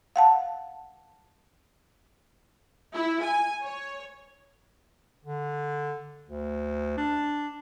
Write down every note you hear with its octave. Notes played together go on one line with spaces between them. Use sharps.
F5 F#5 A5
E4
G#5
C#5
D3
D2
D4